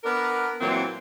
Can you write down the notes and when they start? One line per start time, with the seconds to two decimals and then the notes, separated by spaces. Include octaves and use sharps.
0.04 B3 D4 A#4
0.60 A#2 E3 F#3 C4